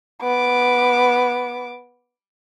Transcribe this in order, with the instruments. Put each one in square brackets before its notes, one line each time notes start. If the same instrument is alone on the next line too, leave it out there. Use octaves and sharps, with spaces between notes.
[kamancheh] B3 D6